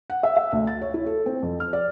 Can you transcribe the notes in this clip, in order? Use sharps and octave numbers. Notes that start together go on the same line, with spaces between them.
F#5
E5
E5
D2
A6
C#5
E4
A4
C4
F2
F6
D5